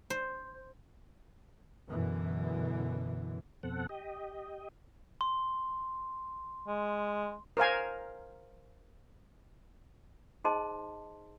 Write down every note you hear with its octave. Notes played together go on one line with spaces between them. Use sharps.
C5
F#2 B2 D3 E3
F2 B2 C4 A4 F#5
G4 D#5
C6
G#3
A#4 C5 F5 G#5
D#4 G#4 C5 D#5 A5 C6